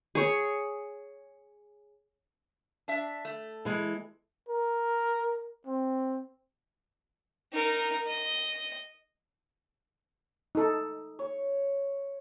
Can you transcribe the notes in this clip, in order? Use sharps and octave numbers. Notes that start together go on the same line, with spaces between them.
G#4 C#5
D4 E5
A3
E3 G#3
A#4
C4
D#4 A#4
D#5
D#4 A4
C#5